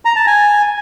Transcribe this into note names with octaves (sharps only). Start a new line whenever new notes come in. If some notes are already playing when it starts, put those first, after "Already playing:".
A#5
A5
G#5